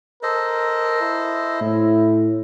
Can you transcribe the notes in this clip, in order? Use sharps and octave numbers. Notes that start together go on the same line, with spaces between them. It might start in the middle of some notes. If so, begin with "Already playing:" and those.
A4 A#4 C5 D#5
E4
A2